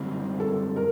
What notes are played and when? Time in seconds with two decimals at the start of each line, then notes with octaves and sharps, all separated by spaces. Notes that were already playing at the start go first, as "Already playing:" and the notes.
Already playing: F#2 D3 G3 C4 E4
0.40 A4
0.76 A#4